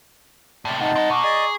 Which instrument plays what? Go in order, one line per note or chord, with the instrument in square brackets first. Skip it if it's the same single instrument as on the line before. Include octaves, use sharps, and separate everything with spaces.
[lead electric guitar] A2 C3 [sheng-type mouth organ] D5
[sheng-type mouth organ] D#4 A5 [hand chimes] F#5
[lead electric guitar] C4 D#5
[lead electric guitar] B2 [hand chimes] A#5 C#6 D6
[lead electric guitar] G#4 [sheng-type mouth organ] D5 D#5